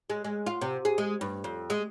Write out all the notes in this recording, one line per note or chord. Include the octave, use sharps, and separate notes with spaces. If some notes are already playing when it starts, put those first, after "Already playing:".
G#3
G#3
F4
C3
G#4
G#3
G2
F2
G#3